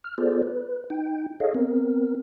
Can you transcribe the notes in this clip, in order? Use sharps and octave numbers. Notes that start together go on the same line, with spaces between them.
F6
B3 F4 G#4 A4 C5 D5
B4
D#4 G5
G#4 A4 C#5 D#5 F5
B3 C4 A#4